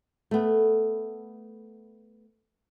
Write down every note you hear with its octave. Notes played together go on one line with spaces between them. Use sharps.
A3 B3